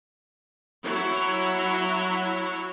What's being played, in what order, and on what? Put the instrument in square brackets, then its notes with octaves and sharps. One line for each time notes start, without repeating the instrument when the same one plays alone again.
[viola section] F#3 E4 C#5